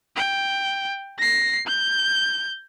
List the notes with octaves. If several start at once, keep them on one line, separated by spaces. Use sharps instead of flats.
G5
A#6 C7
G6